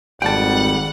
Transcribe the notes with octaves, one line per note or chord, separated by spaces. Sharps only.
G#1 F2 G3 F#5 G5 A5